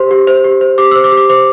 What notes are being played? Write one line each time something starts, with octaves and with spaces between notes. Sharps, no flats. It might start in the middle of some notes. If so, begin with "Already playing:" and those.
Already playing: G4 C5 C6
G4
C5
G4
C5
G4 D6
C5 E6
D6
G4
D6
C5 D6